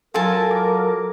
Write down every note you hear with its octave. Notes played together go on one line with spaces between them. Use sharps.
F#3 F4 A4 A#4 G#5 A5
D6